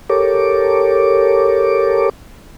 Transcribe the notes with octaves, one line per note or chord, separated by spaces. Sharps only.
G4 A4 A#4 C#5 D6